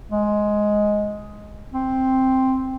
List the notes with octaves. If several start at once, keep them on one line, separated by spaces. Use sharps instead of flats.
G#3
C4